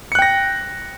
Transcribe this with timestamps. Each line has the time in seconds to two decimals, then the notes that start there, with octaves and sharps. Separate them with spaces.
0.12 C#7
0.15 F#6
0.19 G5
0.22 A#6